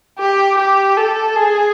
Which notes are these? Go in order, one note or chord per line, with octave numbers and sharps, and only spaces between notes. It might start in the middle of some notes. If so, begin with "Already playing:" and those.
G4
G4
A4
G#4